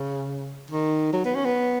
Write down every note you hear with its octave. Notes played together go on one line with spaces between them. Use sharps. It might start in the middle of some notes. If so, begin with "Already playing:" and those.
Already playing: C#3
D#3
F#3
B3
C#4
B3